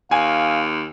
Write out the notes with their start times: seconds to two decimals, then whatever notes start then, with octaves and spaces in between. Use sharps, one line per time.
0.11 D#2 F5 G#5